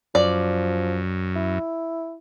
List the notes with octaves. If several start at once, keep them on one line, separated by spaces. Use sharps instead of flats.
F#2 F3 D5
E4